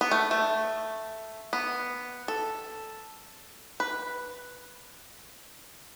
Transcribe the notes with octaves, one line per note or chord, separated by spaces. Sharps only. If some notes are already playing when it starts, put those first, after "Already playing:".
B3
A3
A3
B3
A4
B4